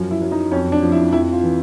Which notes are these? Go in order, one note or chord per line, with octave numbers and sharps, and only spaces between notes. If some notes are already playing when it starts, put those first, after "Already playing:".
Already playing: F#2 F3
E4
F#3
D#4
F2 C#4
D4
F3
E4
F2 E4
F4
E3